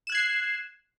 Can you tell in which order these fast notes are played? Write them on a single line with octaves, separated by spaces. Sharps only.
E7 F#6 G#6 C7